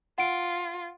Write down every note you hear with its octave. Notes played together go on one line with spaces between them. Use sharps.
F4 F#5 D7